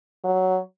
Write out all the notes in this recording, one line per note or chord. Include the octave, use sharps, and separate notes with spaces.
F#3